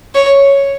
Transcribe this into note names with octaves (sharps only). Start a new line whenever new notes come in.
C#5